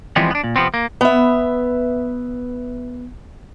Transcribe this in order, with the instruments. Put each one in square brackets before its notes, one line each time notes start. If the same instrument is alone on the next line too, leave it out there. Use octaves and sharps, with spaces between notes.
[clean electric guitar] E3 F3 G3 G#3 B3 C4
B3 D4
A#2
C3 F3 B3 C4
A#3
[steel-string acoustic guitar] B3 E5